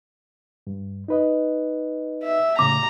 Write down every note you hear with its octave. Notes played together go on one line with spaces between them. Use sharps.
G2
D#4 B4 D#5
E5
A2 C#3 C#4 A#5 D6